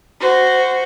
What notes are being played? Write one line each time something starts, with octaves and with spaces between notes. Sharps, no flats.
F#4 C5